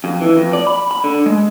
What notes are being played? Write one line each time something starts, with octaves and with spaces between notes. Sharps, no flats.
F2
E3
F2
D5
B5
B5
D3
G#3